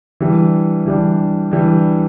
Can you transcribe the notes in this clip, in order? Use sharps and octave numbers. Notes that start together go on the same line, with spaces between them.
E3 G3 D4
E3 G3 D4
E3 G3 D4